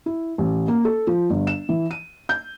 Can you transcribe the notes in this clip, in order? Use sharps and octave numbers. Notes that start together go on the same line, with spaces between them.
E4
A1
A#3
A4
F3
G1
E7
E3
D#7
G6